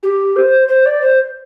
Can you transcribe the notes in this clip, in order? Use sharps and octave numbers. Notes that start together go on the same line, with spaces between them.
G4
C5
C5
D5
C5